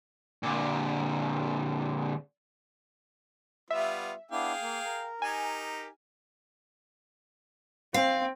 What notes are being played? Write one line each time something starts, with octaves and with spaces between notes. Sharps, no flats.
A#2 D3
G3 B3 F4 E5
B3 D4 E4 G#4 F5 G5
A#3
A#4
D#4 G4 G#5
C4 F5